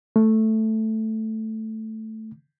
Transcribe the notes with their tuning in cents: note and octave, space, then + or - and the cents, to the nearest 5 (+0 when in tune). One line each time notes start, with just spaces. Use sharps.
A3 +0